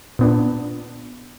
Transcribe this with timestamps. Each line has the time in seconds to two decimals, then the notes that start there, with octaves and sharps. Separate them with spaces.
0.19 A#2 B3 D4